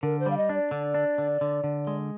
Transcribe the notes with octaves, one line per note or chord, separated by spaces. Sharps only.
D3 A#4
C5
G3 F5
D#5
D4
D5
D3
D4
D3
D3
D3
G#3